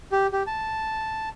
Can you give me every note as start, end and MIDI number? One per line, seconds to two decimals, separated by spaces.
0.12 0.27 67
0.33 0.43 67
0.47 1.29 81